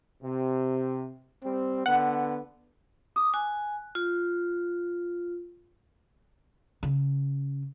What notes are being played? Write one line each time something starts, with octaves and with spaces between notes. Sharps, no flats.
C3
G3 C4
D3 B3 F#5
D6 D#6
G#5 F#6
F4
C#3